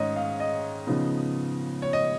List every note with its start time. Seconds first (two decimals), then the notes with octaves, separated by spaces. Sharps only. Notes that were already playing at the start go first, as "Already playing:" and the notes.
Already playing: G#2 D#3 C#4 C#5 D#5
0.16 F5
0.40 D#5
0.87 C#3 F3 B3 D#4
1.82 C#5
1.93 D#5